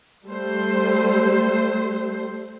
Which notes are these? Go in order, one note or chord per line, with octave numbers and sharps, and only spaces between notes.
G3 A3 C5